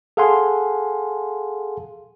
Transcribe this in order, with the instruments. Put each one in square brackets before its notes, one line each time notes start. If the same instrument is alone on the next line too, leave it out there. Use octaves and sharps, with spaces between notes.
[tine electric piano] G#4 A4 F5 F#5 G#5 C6